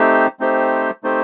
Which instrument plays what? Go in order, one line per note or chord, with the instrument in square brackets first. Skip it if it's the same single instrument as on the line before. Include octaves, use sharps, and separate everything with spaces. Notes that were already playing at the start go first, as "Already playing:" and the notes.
Already playing: [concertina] A3 C4 D#4 G4 C5
A3 C4 D#4 G4 C5
A3 C4 D#4 G4 C5